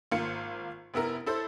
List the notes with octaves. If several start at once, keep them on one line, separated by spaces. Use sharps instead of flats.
G#1 A#3 F4 C#7
F1 B3 E4 A#4
E4 A4 C5